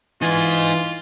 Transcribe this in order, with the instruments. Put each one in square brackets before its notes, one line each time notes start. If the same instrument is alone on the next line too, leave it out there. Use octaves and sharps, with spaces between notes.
[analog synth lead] E3 [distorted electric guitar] D#4 G#5 [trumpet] F4